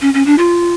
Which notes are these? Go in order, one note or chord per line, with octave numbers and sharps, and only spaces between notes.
C#4
C#4
D4
F4